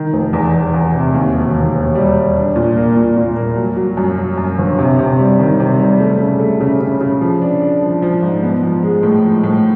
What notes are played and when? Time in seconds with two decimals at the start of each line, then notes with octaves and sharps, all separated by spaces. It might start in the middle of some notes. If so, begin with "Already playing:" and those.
Already playing: D#3
0.13 F1
0.33 E2
0.54 E2
0.74 E2
0.94 C3
1.14 D#2
1.34 E1
1.54 D#2
1.75 E1
1.95 G3
2.16 G3
2.36 D4
2.56 A#2
2.76 A#3
2.96 A#2
3.16 A#2
3.37 A#3
3.57 F#3
3.77 F#3
3.97 F#2
4.18 F#3
4.37 F#2
4.59 G1
4.78 C3
4.99 C3
5.19 G3
5.39 D#3
5.60 C3
5.79 G3
6.00 A3
6.20 C#3
6.40 A3
6.60 C#3
6.81 C#3
7.01 C#3
7.21 F3
7.41 D4
7.62 D4
7.82 F3
8.02 F3
8.22 G#2
8.43 B3
8.63 F3
8.83 G#3
9.03 A2
9.23 F3
9.44 A2